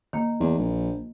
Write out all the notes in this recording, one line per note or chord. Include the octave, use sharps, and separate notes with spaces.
D#3 A#3
E2
A#1